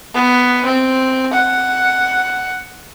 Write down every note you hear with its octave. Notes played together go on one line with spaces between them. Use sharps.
B3
C4
F#5